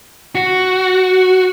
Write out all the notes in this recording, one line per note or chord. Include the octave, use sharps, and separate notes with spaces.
F#4